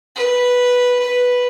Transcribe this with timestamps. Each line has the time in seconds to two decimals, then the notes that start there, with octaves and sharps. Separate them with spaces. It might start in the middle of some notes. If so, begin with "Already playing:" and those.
0.16 B4
1.00 B4